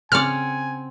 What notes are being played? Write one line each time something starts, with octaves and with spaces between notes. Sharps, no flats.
C#3 C4 D5 F#5 G#5 F6